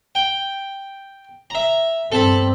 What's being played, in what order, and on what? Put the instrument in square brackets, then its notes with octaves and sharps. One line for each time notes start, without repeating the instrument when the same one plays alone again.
[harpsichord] G5
E5 A#5
[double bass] G2 C4 [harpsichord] A4 A5 B5